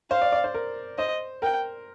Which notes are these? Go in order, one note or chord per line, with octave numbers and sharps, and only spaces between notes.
C5 F5
D5
D5
C5
A#4
C5 D#5
A#4 G5